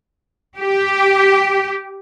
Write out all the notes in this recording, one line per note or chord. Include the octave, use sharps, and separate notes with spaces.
G4